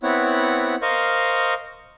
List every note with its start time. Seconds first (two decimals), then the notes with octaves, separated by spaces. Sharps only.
0.03 B3 C4 E4 C#5 F#5
0.82 A#4 C5 D#5 F5 C#6